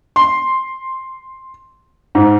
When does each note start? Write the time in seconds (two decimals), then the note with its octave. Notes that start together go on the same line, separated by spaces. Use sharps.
0.16 C6
2.15 G#2